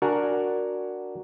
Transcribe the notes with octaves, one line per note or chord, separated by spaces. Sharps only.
D4 F#4 A#4 F#5 G#5